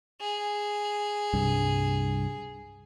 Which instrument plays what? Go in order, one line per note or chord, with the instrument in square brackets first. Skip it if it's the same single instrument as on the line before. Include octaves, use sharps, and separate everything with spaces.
[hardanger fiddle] G#4
[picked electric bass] C2 G2